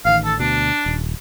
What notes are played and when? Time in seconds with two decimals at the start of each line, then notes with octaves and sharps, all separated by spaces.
0.05 A1 D#3 F5
0.24 A4
0.39 D2 B2 D4
0.86 D#1